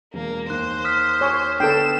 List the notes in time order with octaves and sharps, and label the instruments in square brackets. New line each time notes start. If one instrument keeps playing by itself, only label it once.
[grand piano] E1 [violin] A#3
[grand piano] D#2 [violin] C5 [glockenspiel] F#6
[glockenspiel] D#6 F6 B6
[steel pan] C#5 G#5
[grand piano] D3 B3 [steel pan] A4 G5 [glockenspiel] C7 [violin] E7